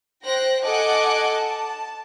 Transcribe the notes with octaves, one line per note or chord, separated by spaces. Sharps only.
C5 G5 F#6 A#6
A4 D#5 F#5 G#5 D6 F#6
A5